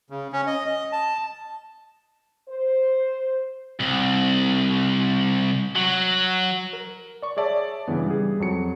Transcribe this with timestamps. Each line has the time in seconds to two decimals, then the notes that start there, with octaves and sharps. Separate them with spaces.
0.10 C#3
0.33 C#4
0.47 D#5
0.66 D#5
0.92 A5
2.48 C5
3.80 C2
5.76 F#3
6.73 A#4
7.22 D5 C#6
7.37 G#4 C#5 D5 E5 A5
7.88 G2 C#3 E3 B3
8.06 G3 G#4
8.40 F2 F#3 C#7